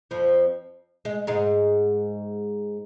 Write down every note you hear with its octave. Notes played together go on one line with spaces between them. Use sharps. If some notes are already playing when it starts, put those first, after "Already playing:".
F2 F3
G#3
G#2 G#3